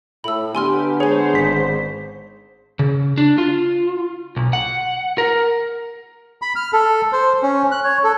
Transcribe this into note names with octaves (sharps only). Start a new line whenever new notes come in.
A2 B5 E6
D3 B3 G4 G#5 C6 F6
G#3 G#4 C5 C#5 G#5
G#1 B6
C#3
D4
F4
B1
F#5
A#4
B5
F6
A4
C5
C#4
F#6
C#5
A4